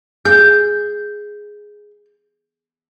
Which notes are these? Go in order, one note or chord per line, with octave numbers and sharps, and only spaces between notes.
G#4 G6